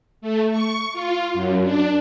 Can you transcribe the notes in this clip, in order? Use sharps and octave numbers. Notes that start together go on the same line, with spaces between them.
A3
C#6
F4
F#2
D4